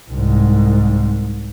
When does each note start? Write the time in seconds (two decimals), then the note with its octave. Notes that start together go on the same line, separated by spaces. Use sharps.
0.11 C2 G#2